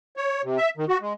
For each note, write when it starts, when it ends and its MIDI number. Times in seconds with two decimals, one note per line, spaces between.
0.17 0.42 73
0.44 0.58 48
0.58 0.70 76
0.77 0.85 51
0.89 0.98 66
1.01 1.13 56